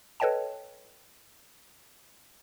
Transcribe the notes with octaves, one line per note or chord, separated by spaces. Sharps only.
A4 B4 C#5 D#5 G5 A5